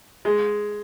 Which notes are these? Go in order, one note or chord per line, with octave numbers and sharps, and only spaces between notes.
G#3